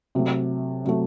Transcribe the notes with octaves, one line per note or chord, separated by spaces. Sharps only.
C3 F#3 A3
C3 F#3 A3